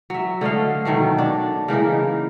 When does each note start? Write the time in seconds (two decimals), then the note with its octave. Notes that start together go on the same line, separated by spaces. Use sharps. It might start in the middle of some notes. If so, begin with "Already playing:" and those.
0.10 F#3 E5
0.41 D3 A3 D#5 F5
0.85 B2 D#3 F#3 A3
1.18 D4
1.68 C#3 E3 A#3 D#4